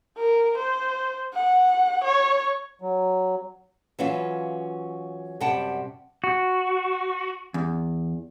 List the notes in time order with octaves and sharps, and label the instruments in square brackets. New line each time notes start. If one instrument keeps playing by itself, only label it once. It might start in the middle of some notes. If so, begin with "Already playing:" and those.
[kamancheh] A#4
C5
F#5
C#5
[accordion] F#3
[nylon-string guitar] E3 F#3 C#4 F4 E5 F5
F#2 C3 G3 F#5 G5 A5
[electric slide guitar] F#4
[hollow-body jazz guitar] E2